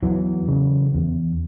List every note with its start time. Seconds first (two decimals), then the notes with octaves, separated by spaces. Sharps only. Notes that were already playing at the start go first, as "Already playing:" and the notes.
0.03 E2 E3 F#3
0.48 C#3
0.94 E2